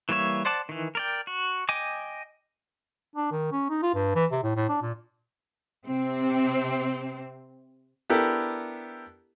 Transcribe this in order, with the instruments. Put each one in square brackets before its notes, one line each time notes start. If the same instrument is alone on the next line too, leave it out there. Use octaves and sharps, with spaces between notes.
[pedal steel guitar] E3 G3 A#3 C#5 E5
C5 D5 F#5 A5 D6
D#3 E3
A#4 D5 G5
F#4
D#5 G5 G#5 D6
[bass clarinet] D4
D#3
C#4
D#4
F4
G2
E3
C3
A2
A2
D4
A#2
[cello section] C3 C4
[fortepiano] B3 D4 E4 G4 A4 A#4